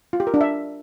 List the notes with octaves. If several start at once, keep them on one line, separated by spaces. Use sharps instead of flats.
F4
G4
A#4
D4
E5